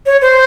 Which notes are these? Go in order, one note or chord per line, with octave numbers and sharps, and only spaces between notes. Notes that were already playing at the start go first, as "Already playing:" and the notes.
C#5
C5